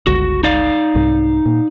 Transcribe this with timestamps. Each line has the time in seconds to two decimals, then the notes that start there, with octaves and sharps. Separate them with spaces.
0.07 G1 C#2 F#4
0.43 D#4 D5 F5
0.95 C2 G#2
1.46 A#2